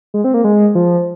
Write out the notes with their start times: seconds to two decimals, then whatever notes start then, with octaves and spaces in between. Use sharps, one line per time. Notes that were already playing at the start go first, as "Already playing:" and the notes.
0.14 G#3
0.24 C4
0.34 A#3
0.44 G#3
0.75 F3